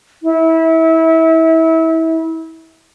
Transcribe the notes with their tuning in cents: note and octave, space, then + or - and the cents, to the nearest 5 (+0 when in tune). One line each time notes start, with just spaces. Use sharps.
E4 -25